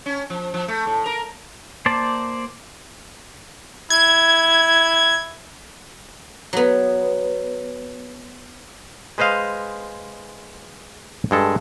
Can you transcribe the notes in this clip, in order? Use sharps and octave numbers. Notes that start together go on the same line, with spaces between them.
C#4
F3
F3
A3
A2
A#4
A#3 C5 D5 A5
E4 G#6
F#3 B3
G#3 B4 C5 D#5 F5
G2 G#3 A4